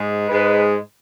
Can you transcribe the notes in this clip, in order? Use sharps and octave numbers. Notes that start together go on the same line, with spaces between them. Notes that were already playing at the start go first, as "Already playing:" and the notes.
Already playing: G#2 G#3
G#2 G#3 B4